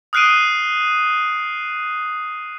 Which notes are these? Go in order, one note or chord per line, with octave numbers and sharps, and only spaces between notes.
D#6 F6 F#6 C7 D7 D#7